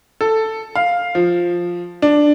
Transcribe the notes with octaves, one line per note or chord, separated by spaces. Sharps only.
A4
F5
F3
D4